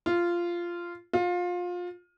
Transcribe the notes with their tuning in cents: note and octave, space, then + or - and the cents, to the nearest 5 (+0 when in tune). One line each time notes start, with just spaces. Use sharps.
F4 -10
F4 +25